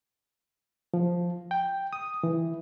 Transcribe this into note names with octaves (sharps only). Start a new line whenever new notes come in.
F3
G5
D#6
E3